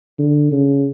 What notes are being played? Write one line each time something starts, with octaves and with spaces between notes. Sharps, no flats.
D3
C#3